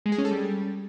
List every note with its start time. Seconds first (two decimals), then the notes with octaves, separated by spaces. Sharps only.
0.06 G#3
0.12 G#4
0.18 C#4
0.25 A4
0.31 G3